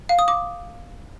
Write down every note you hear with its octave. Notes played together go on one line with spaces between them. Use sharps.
F5
D#6
D6